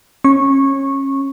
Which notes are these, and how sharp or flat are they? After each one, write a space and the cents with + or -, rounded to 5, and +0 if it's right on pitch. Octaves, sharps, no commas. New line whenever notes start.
C#4 -30 C#6 -15